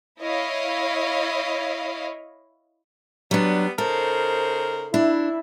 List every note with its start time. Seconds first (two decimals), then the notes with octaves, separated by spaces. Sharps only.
0.20 E4 C#5 D#5 F5
3.31 F#3 G3 B3 D4
3.78 C#3 D#4 A4 A#4 C5
4.94 D4 E4